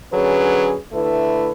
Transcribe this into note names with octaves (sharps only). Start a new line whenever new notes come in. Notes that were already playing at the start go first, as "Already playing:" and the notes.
D3 F#3 C#4 G#4 B4
D3 A3 E4 B4